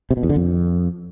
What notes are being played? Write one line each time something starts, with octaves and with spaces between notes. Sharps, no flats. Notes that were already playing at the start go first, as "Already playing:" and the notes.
C3
B2
E2
D3
F2